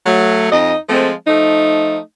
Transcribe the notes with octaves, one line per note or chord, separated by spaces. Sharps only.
F#3 A3
F2 D#4 D#5
F3 G#3 A3 C4
F3 A3 D#4